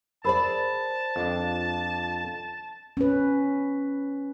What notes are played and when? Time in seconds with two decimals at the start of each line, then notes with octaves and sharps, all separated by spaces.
0.25 G#4 A#4 C5 D5 A5 B5
1.16 F2 D4
2.97 C#4 B4